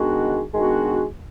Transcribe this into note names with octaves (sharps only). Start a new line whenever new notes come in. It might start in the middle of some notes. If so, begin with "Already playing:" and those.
Already playing: D#3 G#3 B3 D4 F#4
D#3 G#3 B3 D4 F#4